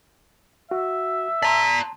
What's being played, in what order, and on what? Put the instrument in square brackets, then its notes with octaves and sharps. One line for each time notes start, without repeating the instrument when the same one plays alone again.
[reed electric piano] F#4 [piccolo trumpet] E5
[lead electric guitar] D5 A#5 [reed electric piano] A5 C6 [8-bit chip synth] B6